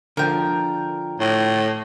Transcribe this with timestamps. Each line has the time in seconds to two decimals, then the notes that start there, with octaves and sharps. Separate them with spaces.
0.17 D3 F3 A#4 G5
1.20 A2